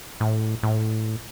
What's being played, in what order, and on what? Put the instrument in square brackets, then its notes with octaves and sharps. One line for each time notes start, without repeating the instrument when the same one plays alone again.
[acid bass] A2
A2